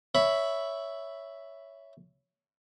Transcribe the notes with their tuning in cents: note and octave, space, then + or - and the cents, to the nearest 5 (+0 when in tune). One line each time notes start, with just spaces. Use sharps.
C#5 +10 E5 +0 B5 +0